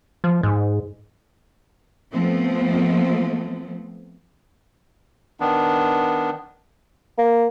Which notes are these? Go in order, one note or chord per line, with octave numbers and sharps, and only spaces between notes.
F3
G#2
F3 A3 B3 C4
D#3 B3 D4
A#3